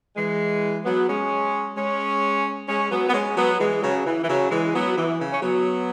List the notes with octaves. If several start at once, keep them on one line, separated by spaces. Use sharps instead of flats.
E3 G#3
F#3 B3
G#3 C#4
G#3 C#4
G#3 C#4
F#3 B3
B3
G#3 C#4
F#3 B3
E3 G#3
C#3 F#3
E3
E3
C#3 F#3
E3 G#3
F#3 B3
E3
C#3
C#4
F#3 B3